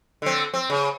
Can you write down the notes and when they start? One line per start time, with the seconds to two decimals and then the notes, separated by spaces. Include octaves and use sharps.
0.22 D3 C4
0.54 C4
0.70 C#3